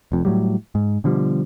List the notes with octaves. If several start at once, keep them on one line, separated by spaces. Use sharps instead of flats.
F1 F2
A2 F#3 G3
G#2
B2 D3 F3 G3